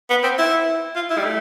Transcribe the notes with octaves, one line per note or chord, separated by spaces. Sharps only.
B3
C4
E4
F4
E4
G3
A3